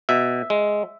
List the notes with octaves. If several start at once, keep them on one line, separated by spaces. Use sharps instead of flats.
B2 E5
G#3